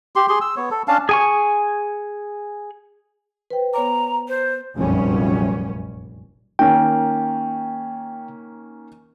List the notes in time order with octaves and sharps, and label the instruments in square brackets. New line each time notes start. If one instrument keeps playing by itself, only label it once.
[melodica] G4 C6
G#4 C6
E6
B3 C#5
A4
C#4 D4 F5 A5
[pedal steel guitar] G#4 G#5 C#6
[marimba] B4 C5 G5
[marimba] B3 C#5 D6 [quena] A#5
[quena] C5
[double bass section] F1 A#1 F#2 G3 C#4
[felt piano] D#3 A#3 C#4 [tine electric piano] G5